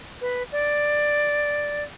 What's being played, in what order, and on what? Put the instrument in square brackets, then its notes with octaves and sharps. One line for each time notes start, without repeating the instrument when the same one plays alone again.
[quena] B4
D5